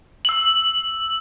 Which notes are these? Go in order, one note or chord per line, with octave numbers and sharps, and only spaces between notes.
E6 F#7